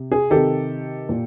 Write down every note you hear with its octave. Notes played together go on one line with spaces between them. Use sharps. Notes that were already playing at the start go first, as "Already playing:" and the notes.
Already playing: C3
G#4
C3 D#3 G4 A4
A#2